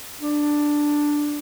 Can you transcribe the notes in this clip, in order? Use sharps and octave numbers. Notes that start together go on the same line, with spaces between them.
D4